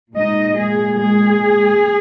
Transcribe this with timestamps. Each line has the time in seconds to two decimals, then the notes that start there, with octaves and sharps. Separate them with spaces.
0.16 A#2 G#3 D#4 D#5
0.57 G#3 G#4
0.98 G#3 G#4